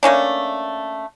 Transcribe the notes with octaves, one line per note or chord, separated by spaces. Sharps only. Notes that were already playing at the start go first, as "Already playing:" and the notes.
A3 A#3 C#4 D4